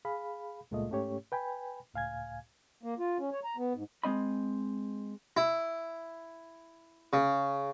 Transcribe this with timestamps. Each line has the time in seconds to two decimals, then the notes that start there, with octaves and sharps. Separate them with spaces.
0.05 G#4 F5 B5
0.71 C#2 A#2 G#3 A3 F4 D#5
0.90 G#2 A3 C#4 G4 C#5
1.32 B4 G5 G#5 B5
1.93 C#2 A2 F5 G#5 G#6
2.83 A#3
2.99 F4
3.19 C#4
3.33 C#5
3.44 A#5
3.57 B3
3.74 G#2
4.03 G#3 C4 D#5 B5
5.37 E4
7.13 C#3